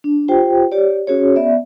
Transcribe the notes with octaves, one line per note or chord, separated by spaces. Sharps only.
D4
F4 G4 C5 G5
G4 C#5 D5
C#4 F#4 G#4 C#5
B3 D5 E5